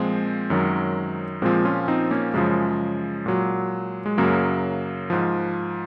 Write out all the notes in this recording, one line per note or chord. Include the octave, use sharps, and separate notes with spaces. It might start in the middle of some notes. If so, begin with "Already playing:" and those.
Already playing: A#2 F3 G#3 C4
F#2 D#3 F#3
A#2 F3 G#3 C4
C#4 F4
C4 D#4
A#3 C#4
F#2 C#3 F3 G#3
A#2 F#3
G#3
F#2 C#3 F#3 A#3
G#2 F3